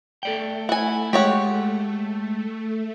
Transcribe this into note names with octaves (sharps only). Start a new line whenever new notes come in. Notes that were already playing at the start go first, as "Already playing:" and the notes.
A3 A4 D5 G5
E4 F#5 G#5
G#3 G4 C#5 F#5